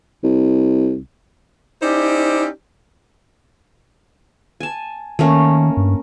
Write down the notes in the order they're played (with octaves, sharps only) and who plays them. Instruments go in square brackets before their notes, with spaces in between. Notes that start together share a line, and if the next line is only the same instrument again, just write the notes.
[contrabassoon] C2
[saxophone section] C#4 D#4 E4 G4 C5 D5
[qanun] G#5 A5
[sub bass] D#3 [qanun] A3 A#3 C#4
[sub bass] G2